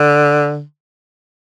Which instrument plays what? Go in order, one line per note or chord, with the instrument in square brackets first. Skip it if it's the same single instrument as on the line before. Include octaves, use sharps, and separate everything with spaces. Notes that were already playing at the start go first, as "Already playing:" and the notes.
Already playing: [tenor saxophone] D3